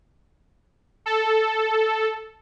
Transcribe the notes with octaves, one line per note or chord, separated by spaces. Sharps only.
A4